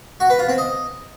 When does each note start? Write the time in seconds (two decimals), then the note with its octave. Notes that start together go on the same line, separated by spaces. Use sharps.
0.20 F#4
0.30 B4
0.39 F4
0.49 C4
0.58 D#5